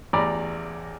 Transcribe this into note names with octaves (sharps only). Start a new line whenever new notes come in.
A1 E2 D5 A#5 B5